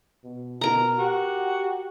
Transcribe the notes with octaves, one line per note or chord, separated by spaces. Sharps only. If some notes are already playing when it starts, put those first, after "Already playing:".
B2
B2 A#4 A#5
F#4 G4